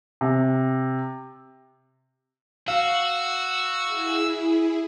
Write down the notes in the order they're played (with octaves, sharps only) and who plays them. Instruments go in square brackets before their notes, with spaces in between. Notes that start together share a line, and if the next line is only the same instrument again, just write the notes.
[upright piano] C3
[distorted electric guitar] F#4 [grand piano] F5 [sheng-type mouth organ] E6
[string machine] E4 G#4